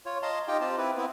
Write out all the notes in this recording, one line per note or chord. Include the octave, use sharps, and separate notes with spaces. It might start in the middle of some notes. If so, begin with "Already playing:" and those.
F4 C#5
D#5 F5 A5 A#5 C6
D#4 F4 G4 D#5 G5
C4 F4 G4 A5
C4 E4 B4
B3 C4 E4